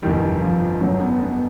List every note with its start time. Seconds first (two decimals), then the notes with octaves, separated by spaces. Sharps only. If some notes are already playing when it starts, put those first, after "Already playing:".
0.02 G1 F2 C3 D#3 E3 G3
0.41 F3
0.81 F#3
1.00 B3
1.20 B3